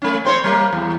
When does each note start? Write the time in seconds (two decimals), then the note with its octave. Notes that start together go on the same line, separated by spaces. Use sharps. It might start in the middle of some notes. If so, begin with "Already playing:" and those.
0.02 A3 C#4
0.25 C4 C5 C#5
0.44 G3 A#3
0.73 E2